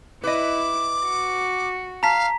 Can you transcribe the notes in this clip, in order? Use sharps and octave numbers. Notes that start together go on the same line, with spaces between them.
E4 B4 D#5 D6
F#4
F5 A5 A#5 B6